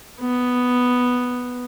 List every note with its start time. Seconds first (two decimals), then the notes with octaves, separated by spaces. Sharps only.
0.20 B3